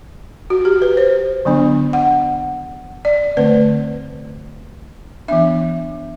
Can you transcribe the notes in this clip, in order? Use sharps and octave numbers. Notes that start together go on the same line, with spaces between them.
F#4
G4
B4
C5
D3 F#3 B3 D4
F#5
D5
D3 A3 C4 B4
E3 B3 D4 E5